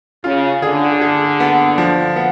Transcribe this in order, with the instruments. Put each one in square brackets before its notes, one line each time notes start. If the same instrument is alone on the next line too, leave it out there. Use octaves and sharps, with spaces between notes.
[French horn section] C#3 [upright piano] F4
[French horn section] D3 [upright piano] G#4
[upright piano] G#4
B3
F3
B3